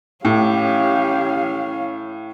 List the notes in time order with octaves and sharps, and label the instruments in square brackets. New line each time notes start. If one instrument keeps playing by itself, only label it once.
[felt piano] A2 [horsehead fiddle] C#4 F5 [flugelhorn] G4